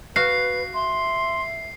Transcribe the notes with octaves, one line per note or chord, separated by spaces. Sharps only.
F#4 B4 F5 C7
E5 C6